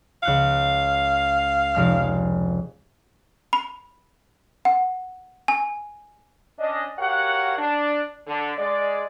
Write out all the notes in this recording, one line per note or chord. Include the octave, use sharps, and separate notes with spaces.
C#2 F5 F#6 C#7
F1 G#3 F6
B5
F#5
G#5
C#4 D4 D#5
F#4 G4 A#4 C#5 F5 F#5
D4
D3
G#3 D5